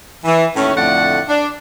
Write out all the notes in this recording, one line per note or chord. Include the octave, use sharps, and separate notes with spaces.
E3
D#2 A2 A3 C#4
F2 A2 D3 A3 D5 F#5
D4